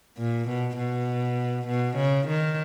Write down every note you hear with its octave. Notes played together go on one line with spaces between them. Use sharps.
A#2
B2
B2
B2
C#3
D#3